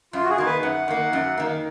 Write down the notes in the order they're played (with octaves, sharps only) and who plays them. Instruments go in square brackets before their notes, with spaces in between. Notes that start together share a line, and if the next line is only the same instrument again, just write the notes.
[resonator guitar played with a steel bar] F#2 [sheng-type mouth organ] F4
[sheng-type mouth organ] F#4
G#4
[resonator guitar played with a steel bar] D#3 A#3
[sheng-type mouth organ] B4
[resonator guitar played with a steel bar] F#2 [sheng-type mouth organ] F#5
[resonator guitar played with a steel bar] D#3 A#3
F#2
D#3 A#3